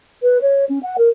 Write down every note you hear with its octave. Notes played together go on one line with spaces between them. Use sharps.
B4
C#5
C#4
F#5
A#4